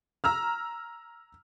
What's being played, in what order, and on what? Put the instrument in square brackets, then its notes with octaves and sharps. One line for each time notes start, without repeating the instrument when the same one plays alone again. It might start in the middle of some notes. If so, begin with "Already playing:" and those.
[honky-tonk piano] A#5 E6 F6